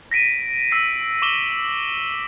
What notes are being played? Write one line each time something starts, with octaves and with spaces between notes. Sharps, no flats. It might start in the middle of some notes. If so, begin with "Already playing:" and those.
A#6 B6 D7 D#7
E6 B6 C7
C#6 D6 E7 F#7 G7